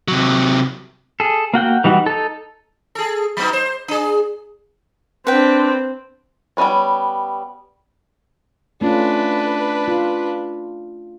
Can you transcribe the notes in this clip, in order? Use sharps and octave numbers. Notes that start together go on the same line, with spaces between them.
C3 F#3
G#4 A4
A#3 F#4 G5 F#6
E3 G3 D#4 F#4
D#4 A4
G#4 A4
F#3 B3 D#4
C5
D4 G#4
C4 D4 B4 G5
G3 B3 C#4 B4 C#5
A3 C#4 D4 F4 B4
F4